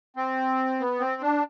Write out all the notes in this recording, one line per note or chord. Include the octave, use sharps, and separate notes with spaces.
C4
B3
C4
D4